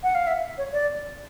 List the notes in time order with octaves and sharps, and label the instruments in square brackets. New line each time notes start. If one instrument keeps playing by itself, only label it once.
[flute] F#5
F5
E5
C#5
D5